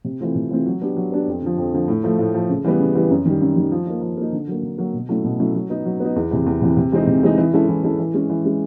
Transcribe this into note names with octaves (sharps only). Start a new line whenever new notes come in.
C3
E3 A3 C4 F4
C3
E3 A3 C4 F4
F#3
B3 D4 G4
F#3
B3 D4 G4
F2
D3 F3
F2
D3 F3
A2
F3 A3
A2
F3 A3
C#3
E3 G3 B3
C#3
E3 G3 B3
F#2
D#3 G3
F#2
D#3 G3
F3
A#3 D#4
F3
A#3 D#4
D3
F#3 A#3
D3
F#3 A#3
B2
F#3 A3 C#4 E4
B2
F#3 A3 C#4 E4
F#3
B3 D#4
F#3
B3 D#4
E2
C3 E3
E2
C3 E3
C3
E3 G#3 C4 D#4
C3
E3 G#3 C4 D#4
E3
G#3 C#4 E4 A4
E3
G#3 C#4 E4 A4
E3
G#3 C#4
E3
G#3 C#4